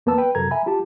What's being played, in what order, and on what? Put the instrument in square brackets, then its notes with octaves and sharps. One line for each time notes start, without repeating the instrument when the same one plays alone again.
[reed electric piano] E2 A#3 B3 B4 A5 E6
B4 G5
F#2 C3 A4 A#4 A#5 G#6
E5 G#5 A#5 B5
F4 G4 A5